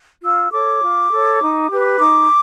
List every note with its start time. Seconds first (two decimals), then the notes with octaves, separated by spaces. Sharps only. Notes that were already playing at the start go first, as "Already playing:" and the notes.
0.22 F4 E6
0.51 A4 C#5 D6
0.82 F4
1.11 A4 C#5
1.40 D#4
1.69 G4 B4
1.99 D#4 D6